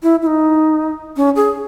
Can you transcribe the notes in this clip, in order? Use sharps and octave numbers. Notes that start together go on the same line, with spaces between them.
E4
E4
D#4
C#4
G#4